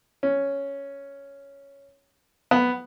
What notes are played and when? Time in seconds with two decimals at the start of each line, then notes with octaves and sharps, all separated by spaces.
0.23 C#4
2.51 B3